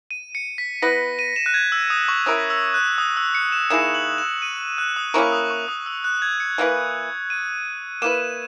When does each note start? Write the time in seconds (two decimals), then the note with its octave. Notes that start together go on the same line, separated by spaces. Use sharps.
0.11 D#7
0.35 C#7
0.58 B6
0.82 B3 E4 B4 A#6
1.19 D#7
1.36 E7
1.46 F#6
1.54 G#6
1.72 E6
1.90 D#6
2.08 C#6
2.26 C#4 E4 A#4 E5 D#6
2.50 E6
2.74 F#6
2.98 D#6
3.17 E6
3.35 C#7
3.52 E7
3.70 D#3 A#3 E4 G#4 E7
3.94 F#7
4.18 E7
4.42 D#7
4.78 F#6
4.96 D#6
5.14 A#3 C#4 E4 A#4 C#6
5.32 D#6
5.50 C#6
5.68 D#6
5.86 E6
6.04 F#6
6.22 G#6
6.40 C#7
6.58 E3 A#3 E4 B4
7.30 D#7
8.02 A#3 E4 B4 E7